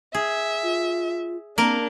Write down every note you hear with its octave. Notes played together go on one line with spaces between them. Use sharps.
G#4 E5
F4
A#3 C4 D4 A#4